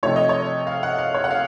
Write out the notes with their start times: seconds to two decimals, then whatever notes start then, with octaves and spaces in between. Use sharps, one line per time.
0.03 C3 F3 A3 D#4 C#5
0.16 D#5
0.29 C#5
0.67 F5
0.83 F#5
0.98 F5
1.15 C#5
1.24 F#5
1.31 F5